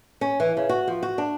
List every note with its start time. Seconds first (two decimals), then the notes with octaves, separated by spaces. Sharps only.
0.21 C#4
0.40 E3
0.57 C#3
0.69 F#4
0.88 F3
1.03 F#4
1.18 D4